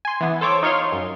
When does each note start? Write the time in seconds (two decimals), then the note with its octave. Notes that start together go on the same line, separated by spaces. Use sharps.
0.05 G#5 C6
0.20 E3 B3
0.41 A4 C5 C#5 D6
0.63 D#4 F4 C#5 F5 C6
0.92 F#2